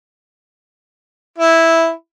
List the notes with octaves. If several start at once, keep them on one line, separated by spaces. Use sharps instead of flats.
E4